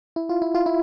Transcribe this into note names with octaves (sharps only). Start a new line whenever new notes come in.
E4
F4
E4
F4
E4